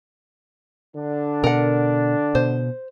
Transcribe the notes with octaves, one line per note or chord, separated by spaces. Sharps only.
D3 D4
B2 A#4 F#5
B2 C5